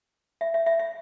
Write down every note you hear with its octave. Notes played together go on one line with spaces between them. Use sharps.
E5
E5
E5
E5